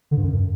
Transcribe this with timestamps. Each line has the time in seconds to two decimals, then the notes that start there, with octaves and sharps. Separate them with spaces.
0.11 D3
0.17 G2
0.23 F#2